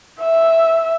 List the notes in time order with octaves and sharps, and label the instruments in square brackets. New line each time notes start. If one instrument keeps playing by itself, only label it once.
[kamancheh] E5